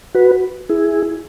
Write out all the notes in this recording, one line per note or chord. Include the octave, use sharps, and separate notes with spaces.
F#4 B4
E4 G#4